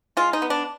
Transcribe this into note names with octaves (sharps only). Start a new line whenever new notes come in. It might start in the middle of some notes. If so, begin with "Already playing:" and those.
G#3 F4
D#4
B3
D4